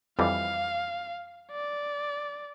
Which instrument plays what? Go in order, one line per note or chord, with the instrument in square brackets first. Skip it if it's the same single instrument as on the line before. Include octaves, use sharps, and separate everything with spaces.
[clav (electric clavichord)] F2 E3 G3 [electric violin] F5
[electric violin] D5